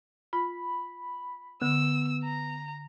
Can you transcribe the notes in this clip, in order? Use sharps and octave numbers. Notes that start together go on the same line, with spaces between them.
F4 B5
D3 B3 E6
A#5